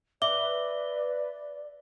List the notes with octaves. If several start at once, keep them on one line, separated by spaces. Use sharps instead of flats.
B4 D5 E5 D6 G7